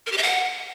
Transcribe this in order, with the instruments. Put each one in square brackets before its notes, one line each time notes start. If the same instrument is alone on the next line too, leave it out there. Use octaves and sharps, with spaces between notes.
[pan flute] A#4
G4
E5
F#5